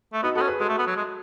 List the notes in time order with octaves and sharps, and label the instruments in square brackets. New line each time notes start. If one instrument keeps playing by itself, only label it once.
[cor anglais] A3
[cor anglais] B3 [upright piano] D#4 F#4
[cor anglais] B3 [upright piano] F#4 A4
[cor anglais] C#4
[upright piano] G#4 B4
[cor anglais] G#3 [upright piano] F#4 A4
[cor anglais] A3
B3
F#3
G#3